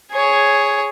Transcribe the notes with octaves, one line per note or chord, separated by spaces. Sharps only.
G#4 C#5